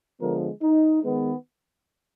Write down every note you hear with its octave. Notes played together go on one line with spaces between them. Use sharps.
D3 F3 G#3 B3 A#4
D#4
D#3 G#3 B3